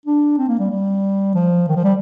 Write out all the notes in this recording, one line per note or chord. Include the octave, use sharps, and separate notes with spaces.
D4
C4
A#3
G3
G3
F3
D#3
F3
G3